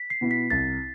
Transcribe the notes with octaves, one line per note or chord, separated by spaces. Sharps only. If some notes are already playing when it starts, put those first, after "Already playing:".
Already playing: B6
C7
B2 B3 E4
B6
C2 A6